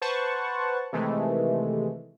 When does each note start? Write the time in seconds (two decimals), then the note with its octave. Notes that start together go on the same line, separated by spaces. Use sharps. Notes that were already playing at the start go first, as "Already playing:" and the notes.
0.02 B4 C5 F#5 A5 C#6
0.93 C3 D#3 E3 G#3 A3